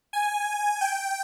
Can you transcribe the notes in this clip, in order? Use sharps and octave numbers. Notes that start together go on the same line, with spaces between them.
G#5
G5